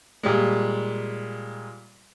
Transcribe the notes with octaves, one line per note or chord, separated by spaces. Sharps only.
A#2 G3 G#3